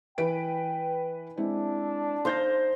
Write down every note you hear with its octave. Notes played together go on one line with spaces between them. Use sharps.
E3 B4 G5 D7
G#3 C4 D4 E4
D#4 C5 F5 G6 A#6